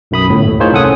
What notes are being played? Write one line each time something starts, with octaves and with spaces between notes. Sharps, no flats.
B1 F#2 B5 D#6
G1 A2
D#2 A2
D#4 F4 G#4 A#4 C5 C#5
C2 C#4 A4 F#5 D#6